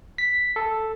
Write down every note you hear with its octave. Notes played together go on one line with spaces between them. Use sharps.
B6
A4